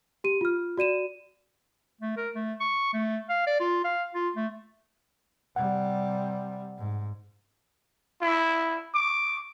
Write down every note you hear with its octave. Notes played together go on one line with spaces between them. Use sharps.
G4 D#7
F4 F6
F#4 D5 D#7 E7
A3
A#4
A3
C#6
A3
F5
D5
F4
F5
F4
A3
C3 G3 F#5
G#2
E4
D6